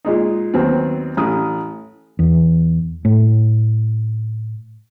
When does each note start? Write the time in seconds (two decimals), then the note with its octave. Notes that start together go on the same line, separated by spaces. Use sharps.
0.05 A#2 G#3 D#4
0.54 D#2 F#3 B3 C4
1.17 A1 D#6
2.19 E2
3.05 A2